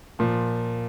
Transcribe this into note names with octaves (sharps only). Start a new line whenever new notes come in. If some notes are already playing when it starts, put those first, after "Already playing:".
A#2 F3